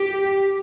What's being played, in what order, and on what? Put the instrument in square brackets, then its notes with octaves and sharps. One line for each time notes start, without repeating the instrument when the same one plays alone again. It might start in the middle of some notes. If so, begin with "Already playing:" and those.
Already playing: [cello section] G4